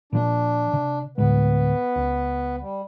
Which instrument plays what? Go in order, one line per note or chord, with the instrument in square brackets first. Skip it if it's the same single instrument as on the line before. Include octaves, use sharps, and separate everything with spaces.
[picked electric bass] A#2 F3 A#3 [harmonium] D4
[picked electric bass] C3
[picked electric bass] D2 A2 G#3 [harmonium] B3 B4
[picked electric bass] C#2
[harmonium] G3